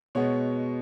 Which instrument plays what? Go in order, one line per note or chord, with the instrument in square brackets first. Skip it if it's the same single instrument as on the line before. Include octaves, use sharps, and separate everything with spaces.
[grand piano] B2 G#3 B3 C#5